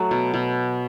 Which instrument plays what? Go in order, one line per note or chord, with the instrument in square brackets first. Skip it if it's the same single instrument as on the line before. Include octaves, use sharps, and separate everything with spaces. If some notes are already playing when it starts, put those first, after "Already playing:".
Already playing: [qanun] F#3 A3
B2
B2